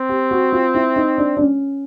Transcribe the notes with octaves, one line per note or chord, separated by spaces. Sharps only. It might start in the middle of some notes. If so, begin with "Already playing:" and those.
Already playing: C4
G4
F#4
F4
E4
D#4
D4
D4
C#4